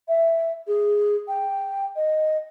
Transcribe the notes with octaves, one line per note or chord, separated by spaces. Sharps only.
E5
G#4
G5
D#5